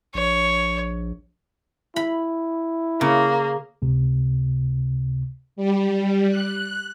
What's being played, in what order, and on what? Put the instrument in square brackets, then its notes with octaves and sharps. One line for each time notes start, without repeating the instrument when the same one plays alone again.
[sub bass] A#1 [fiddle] C#5
[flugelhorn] E4 [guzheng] B5
[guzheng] C#3 [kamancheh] A#3
[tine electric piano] C#2 C3
[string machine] G3
F#6